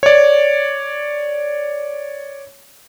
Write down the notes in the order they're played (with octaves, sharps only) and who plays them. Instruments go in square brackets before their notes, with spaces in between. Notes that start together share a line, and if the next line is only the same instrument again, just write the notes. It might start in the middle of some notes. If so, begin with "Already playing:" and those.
[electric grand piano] C#5 D5